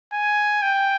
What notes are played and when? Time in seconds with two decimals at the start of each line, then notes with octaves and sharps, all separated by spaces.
0.13 G#5
0.62 G5